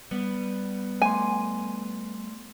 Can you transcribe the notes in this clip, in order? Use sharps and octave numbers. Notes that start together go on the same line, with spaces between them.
G3 B3
A3 G#5 C6